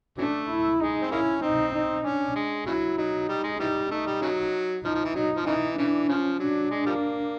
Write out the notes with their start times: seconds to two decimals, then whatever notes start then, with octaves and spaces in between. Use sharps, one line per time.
0.17 E3 F#3 A3 D4
0.49 E4
0.80 G#3 D#4
1.02 C4
1.11 G#3 A#3 C#4 E4
1.42 C4 D#4
1.74 D#4
2.05 C#4 D4
2.36 G#3
2.66 C#3 F#3 E4
2.98 F#3 D#4
3.29 G3
3.44 G#3
3.60 E3 G3 D#4
3.91 A3 D#4
4.06 G3
4.22 C#3 F#3
4.84 F3 D#4
4.95 F3
5.05 E3
5.15 F#3 D#4
5.37 F3
5.46 C#3 E3 D#4
5.78 C#3 E3 D4
6.08 C#3 F3 C#4
6.40 F#3 D4
6.71 G#3
6.86 F3 G3 A#3